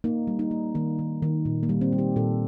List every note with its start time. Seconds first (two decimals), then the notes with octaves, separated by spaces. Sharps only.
0.04 A#3 D#4
0.27 G3
0.39 D#4
0.51 A#3
0.75 D#3 A#3
0.99 D#3
1.22 D#3
1.45 A#2
1.63 A#3
1.69 G3
1.81 C4
1.93 G3
1.98 G4
2.16 A#2 A4